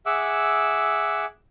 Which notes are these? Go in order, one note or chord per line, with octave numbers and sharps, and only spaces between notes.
G#4 E5 F#5 D6 E6